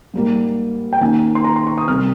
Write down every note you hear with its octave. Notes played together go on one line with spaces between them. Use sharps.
G#2 G3 A#3
G5
D#2 D#3 A#3 C#4 G#5
C6
A#5
C6
C#6
D#6
C2 C3 G3 C4 F6